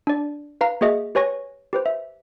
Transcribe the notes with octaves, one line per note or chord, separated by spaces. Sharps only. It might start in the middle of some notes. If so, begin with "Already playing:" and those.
D4 D5
B4 F5 A#5
A#3 F#4 G#4 D#5 E5
G4 B4 C#5 G#5 C#6 A#6
G4 B4 C5
E5